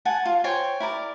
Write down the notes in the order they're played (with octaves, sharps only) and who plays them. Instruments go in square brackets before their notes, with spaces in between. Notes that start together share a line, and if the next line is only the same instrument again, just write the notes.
[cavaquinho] F#5 G#5 A5
F4
C5 C#5 G5 G#5
E4 A#4 D5